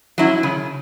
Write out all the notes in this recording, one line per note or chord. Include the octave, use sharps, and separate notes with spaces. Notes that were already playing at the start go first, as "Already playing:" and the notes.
F#3 C#4 E4
C#3